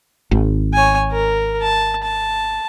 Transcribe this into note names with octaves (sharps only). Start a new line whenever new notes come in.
G#1
C#5 G#5
A#4
A5
A5